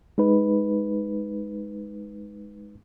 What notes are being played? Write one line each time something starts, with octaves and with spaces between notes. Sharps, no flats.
G#3 D#4 B4